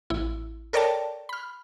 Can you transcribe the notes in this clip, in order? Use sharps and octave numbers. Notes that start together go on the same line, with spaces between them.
A1 E4
A4 A#4 C#5 D5 G5 A5
B5 F6